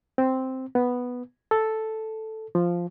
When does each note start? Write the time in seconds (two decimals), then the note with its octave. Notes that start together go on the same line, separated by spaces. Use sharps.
0.18 C4
0.75 B3
1.51 A4
2.55 F3